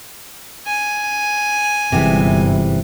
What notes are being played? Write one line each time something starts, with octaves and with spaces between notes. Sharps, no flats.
G#5
G1 C3 E3 G#3